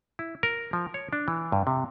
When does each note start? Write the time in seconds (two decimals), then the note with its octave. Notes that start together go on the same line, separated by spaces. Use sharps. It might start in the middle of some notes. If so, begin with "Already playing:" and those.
0.19 E4
0.43 A#4
0.73 F3
0.94 C#5
1.13 D4
1.28 E3
1.52 G2
1.67 C3